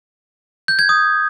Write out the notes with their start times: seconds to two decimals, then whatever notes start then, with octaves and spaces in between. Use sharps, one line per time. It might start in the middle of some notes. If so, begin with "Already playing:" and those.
0.68 G6
0.79 G#6
0.89 D#6